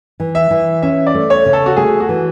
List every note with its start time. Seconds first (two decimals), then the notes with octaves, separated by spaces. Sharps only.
0.20 E3
0.35 E5
0.51 E3
0.82 C#4 E5
1.07 D5
1.14 A3
1.30 C#5
1.46 C#3
1.53 A4
1.66 F#4
1.76 A3 G#4
2.00 F#4
2.09 E3